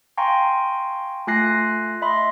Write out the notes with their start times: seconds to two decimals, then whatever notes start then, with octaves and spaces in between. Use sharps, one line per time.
0.18 F5 G5 G#5 A#5 C6 C#6
1.27 A3 F4 G#5 F#6 A#6 C7
2.02 D#5 E5 B5 C6